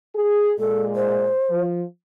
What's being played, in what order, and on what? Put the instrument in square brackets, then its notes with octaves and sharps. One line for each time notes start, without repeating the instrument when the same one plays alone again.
[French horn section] G#4
[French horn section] A#2 G#3 [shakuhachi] A4
[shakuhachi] C5
[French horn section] F3